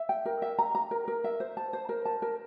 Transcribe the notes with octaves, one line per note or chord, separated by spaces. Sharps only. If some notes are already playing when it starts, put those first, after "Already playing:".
Already playing: E5
G5
A#4
E5
A#5
A#5
A#4
A#4
E5
C5
A5
C5
A#4
A5
A#4